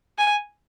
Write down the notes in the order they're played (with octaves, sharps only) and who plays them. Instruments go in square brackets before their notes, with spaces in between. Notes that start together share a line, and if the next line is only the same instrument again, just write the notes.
[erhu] G#5